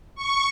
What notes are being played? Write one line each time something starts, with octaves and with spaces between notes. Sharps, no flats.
C#6